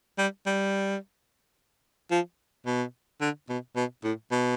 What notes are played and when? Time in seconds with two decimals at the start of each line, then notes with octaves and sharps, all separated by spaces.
0.18 G3
0.46 G3
2.11 F3
2.66 B2
3.21 D3
3.49 B2
3.76 B2
4.04 A2
4.32 B2